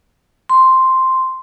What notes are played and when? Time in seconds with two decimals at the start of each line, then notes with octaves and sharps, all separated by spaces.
0.49 C6